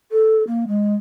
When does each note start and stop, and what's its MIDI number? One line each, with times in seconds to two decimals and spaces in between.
0.11 0.43 69
0.47 0.65 58
0.68 0.95 56